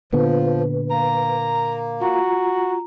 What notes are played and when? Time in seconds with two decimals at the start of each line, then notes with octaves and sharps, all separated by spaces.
0.13 A#2 D3 F3 B3 B4
0.91 A#3 A#5
2.01 F4 F#4 A#5